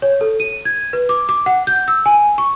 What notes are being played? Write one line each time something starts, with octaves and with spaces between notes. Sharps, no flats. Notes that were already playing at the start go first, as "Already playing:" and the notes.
C#5
A4
D#7
G#6
B4
D6
D6
F#5
G6
E6
G#5
C#6